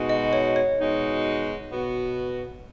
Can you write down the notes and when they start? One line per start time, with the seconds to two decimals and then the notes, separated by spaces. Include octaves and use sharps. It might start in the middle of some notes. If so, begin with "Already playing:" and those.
Already playing: B2 G#3 D#4 F#4
0.09 D#5
0.33 C#5
0.56 C#5
0.79 B2 G#3 D#4 F#4
1.70 B2 B3 F#4